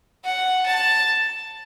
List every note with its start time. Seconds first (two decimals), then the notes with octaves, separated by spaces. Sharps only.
0.25 F#5
0.66 A5